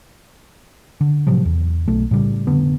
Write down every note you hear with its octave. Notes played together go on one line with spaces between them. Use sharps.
D3
A2 C3 F3 F#3
E2
B1 A3
A2 C#3 G3
F1 D3 B3